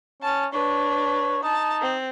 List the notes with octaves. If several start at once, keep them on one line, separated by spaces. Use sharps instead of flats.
C#4 A5
D4 B4 C#5
D#4 A5
C4